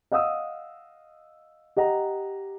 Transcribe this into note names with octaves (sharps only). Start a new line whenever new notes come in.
D#5 F5 F#5 D#6 E6
G4 D#5 F#5 A#5